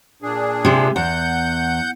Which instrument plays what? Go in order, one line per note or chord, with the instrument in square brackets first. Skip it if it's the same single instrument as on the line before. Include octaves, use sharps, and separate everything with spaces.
[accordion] A#2 D4 G#4
[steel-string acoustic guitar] C3 G#3
[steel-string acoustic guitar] E2 [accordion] F#5 G6